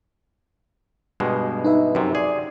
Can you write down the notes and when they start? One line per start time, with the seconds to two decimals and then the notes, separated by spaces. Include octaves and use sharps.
1.20 G2 B2 G#3
1.64 D#4 B4 E5
1.95 F#2 C3
2.15 G#4 D5